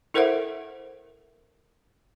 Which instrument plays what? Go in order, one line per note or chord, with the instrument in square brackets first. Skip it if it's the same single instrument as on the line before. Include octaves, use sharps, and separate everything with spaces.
[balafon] E4 A4 A#4 C5 E5 F#5